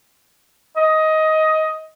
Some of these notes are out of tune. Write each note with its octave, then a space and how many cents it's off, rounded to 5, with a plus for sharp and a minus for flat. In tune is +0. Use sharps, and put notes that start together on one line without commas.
D#5 +15